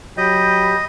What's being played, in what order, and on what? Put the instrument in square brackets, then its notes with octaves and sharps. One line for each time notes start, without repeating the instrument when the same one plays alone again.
[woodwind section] F#3 G5 B5 [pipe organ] G4 G6 [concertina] D#5